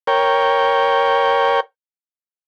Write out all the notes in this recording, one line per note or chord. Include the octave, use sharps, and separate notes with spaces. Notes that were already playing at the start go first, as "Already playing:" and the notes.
A#4 C#5 G5